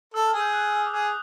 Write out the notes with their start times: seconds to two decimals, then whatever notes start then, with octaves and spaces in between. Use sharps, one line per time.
0.14 A4 E6
0.27 F6
0.33 G#4
0.39 G6
0.53 F#6
0.72 E6
0.79 D#6
0.86 D6
0.91 G#4 D#6